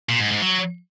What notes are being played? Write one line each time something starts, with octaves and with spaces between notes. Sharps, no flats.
A#2
G#2
G#2
F#3